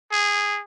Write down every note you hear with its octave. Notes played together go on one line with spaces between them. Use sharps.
G#4